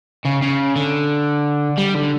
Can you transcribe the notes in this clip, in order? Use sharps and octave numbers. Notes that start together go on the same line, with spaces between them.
C#3
C#3
D3
G3
D3